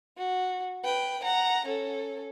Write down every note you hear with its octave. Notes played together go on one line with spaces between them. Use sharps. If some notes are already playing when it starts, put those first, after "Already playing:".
F#4
B4 G5
F#5 A#5
C#4 A4